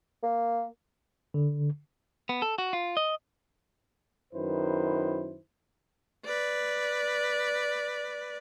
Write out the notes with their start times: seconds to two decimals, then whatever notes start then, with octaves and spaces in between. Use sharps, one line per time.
0.23 A#3
1.34 D3
2.29 B3
2.42 A4
2.58 F#4
2.73 F4
2.97 D#5
4.34 F#2 D#3 E4 B4 C5
6.25 B4 D5